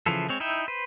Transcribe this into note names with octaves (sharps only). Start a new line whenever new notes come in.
C#3 E3 F3 E4 A4
G#3 C4 C#5
D#4 E4 E5 G5
B4 C5